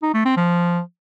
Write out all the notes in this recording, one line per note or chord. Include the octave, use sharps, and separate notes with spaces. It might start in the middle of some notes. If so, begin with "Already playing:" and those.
D#4
A3
C4
F3